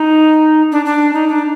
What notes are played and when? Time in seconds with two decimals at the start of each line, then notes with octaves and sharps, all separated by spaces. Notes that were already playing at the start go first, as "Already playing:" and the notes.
Already playing: D#4
0.72 D4
0.85 D4
1.13 D#4
1.28 D4